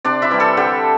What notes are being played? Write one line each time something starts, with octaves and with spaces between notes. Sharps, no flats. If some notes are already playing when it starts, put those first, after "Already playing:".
C3 D4 D5
E4 E5
E3 G3 G5
A4 A5
D3 G4 G5